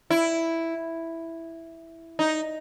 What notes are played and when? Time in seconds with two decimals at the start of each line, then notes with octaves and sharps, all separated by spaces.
0.11 E4
2.19 D#4